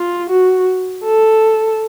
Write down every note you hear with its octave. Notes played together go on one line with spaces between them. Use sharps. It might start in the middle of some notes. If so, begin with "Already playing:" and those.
Already playing: F4
F#4
A4